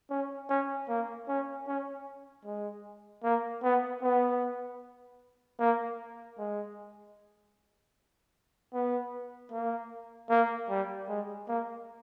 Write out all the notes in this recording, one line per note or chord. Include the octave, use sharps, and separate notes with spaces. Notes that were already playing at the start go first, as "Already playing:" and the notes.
C#4
C#4
A#3
C#4
C#4
G#3
A#3
B3
B3
A#3
G#3
B3
A#3
A#3
G3
G#3
A#3